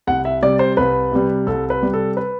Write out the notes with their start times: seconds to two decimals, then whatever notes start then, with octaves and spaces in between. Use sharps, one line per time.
0.07 C2 F#5
0.25 E5
0.42 C3 G3 D5
0.59 C5
0.77 C2 B4
1.12 C3 G3
1.47 C2 A4
1.70 B4
1.82 C3 G3
1.93 A4
2.17 B4